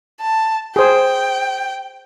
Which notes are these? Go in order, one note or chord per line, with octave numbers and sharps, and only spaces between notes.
A5
G#4 C5 G5